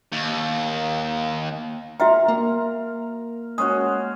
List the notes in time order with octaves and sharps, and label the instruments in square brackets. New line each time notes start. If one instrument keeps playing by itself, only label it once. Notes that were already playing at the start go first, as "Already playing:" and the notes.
[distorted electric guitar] D#2
[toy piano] F#4 E5 G5 [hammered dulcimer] A#4
[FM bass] A#3
[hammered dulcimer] G#3 C#4 F#4 [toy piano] D#6